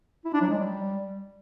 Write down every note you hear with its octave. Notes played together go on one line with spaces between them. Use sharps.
E4
D4
F#3
G#3
G3